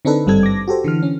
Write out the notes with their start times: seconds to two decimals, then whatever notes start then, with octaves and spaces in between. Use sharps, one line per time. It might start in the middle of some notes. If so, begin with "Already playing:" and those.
0.05 D3 C4 D4 D#4 A4 B4
0.26 G#1 G2 G3 C4 A4 G#6
0.43 D6 A#6
0.68 F#4 G4 A4 C5
0.84 D3 E3 F6
1.03 C#4